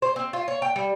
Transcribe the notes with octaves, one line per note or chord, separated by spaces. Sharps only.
C5
C4
F4
C#5
G5
G3